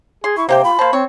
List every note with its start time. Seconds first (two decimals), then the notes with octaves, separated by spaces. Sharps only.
0.24 G#4 C6
0.37 E4 C#6
0.49 C3 A#3 G4 C5 G5
0.64 F4 B5
0.79 A#3 C5 A5
0.93 C4 C#5